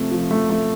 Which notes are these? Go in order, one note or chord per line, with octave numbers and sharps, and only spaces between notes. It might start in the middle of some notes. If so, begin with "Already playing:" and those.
Already playing: C3 F3 A3
F3
A3
A3